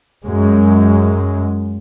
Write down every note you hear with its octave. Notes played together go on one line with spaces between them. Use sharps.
F#2 G#3